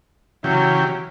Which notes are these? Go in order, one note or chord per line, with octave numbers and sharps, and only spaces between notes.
C#3 E3 F#3 G4